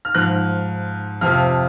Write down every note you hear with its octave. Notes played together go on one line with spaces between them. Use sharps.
F6
G#2 F3 F#6
F2 C3 F3 F6